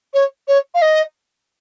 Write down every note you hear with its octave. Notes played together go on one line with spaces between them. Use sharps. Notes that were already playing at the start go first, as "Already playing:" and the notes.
C#5
C#5
F5
D#5